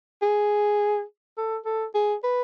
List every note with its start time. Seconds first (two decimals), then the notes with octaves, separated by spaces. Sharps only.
0.22 G#4
1.37 A4
1.65 A4
1.95 G#4
2.24 B4